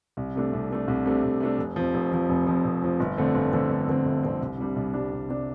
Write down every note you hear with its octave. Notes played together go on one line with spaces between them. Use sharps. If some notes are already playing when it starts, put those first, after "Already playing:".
C2
C3 A3 D4
C2
C3 A3 D4
C2
C3 A3 D4
C2
C3 A3 D4
F1
F2 F3
F1
F2 F3
F1
F2 F3
F1
F2 F3
G1
F2 D3 A3 C4
G1
F2 D3 A3 C4
G1
F2 D3 A3 C4
G1
F2 D3 A3 C4
C2
C3 G3 D4
C2
C3 G3 D4
C2
C3 G3 D4